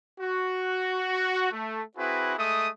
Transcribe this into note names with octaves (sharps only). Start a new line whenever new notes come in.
F#4
A3
C4 E4 F#4 G#4 B4
G#3 A3 D#6